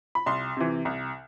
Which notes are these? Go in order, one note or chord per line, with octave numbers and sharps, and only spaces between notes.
B5
C2 C6
C3 E3
C2